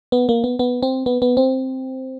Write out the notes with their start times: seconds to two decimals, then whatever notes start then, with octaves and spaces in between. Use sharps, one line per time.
0.12 B3
0.29 A#3
0.44 B3
0.59 B3
0.83 C4
1.06 B3
1.22 B3
1.37 C4